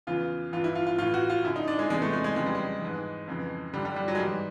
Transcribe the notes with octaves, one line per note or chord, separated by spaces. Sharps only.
E2 C#3 E3 F4
G2 E3 F4
E4
F4
F4
A2 E3 F4
F#4
F4
F#2 D3 E4
D#4
D4
G#3
E2 C3 E3 G#3
A3
G#3
G#3
F2 C#3 E3 G#3
G3
G#3
G#2 E3
F2 C#3 E3
G2 D3 G3
G3
G3
F#3
G#3
G#2 E3 G3